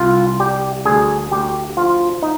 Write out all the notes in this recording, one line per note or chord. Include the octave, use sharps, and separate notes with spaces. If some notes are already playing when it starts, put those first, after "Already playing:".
Already playing: C2 F4
G3 G4
D2 G#4
D2 G4
F3 F4
D#4